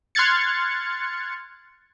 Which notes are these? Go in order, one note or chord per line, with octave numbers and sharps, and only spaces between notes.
C6 F6 F#6 G#6 A6 C#7